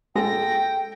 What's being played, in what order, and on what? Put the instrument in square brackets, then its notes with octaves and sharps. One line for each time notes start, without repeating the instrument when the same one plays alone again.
[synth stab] A#2 G#3 [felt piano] A4 [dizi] G5 [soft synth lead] A#6